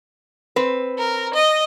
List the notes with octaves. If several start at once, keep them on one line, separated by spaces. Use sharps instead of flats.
C4 B4
A#4
D#5